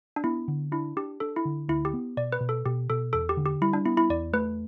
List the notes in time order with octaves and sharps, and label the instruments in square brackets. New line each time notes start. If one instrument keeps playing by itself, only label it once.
[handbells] D4
[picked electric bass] B3 [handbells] E4
[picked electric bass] D3
[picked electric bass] D4 [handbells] E4
[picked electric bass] D4 [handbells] G4
[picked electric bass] D4 [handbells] A4
[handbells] E4
[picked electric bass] D3
[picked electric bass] D2 [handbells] E4
[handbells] G4
[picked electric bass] B3
[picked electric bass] B2 [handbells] D5
[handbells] B4
[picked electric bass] B2
[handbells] A4
[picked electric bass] B2 [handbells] G4
[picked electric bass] B2 [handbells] A4
[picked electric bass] E2 [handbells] A4
[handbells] G4
[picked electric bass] D3
[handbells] G4
[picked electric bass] G3 [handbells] E4
[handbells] D4
[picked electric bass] B3 [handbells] E4
[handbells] E4
[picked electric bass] E2 [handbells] D5
[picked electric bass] A3 [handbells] B4